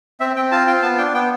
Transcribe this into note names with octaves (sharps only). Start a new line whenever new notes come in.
C4 E5
C4 G5
F4 A5
F4 G5
B3 A5
D4 G5
B3 G5